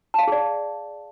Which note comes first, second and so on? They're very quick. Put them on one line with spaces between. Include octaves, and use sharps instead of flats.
A5 F5 D#5 G#4 D5